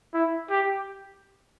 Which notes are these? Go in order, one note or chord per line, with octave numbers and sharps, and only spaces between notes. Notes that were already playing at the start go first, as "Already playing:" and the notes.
E4
G4